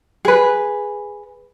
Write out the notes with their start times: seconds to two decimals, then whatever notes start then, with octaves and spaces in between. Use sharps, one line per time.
0.25 G#4 B4